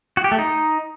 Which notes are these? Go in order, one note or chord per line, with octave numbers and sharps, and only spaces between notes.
F#4
G4
A3
D#4